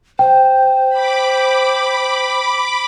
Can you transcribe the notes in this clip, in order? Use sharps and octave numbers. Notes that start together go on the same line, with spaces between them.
C5 G5
B5 D6